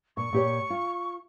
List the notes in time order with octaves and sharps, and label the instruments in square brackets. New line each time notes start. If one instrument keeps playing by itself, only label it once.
[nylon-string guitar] A#2 [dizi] C#6
[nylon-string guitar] A#2 G4 C#5
F4